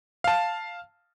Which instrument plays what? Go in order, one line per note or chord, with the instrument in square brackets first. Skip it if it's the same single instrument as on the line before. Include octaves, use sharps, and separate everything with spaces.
[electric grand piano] F5 A5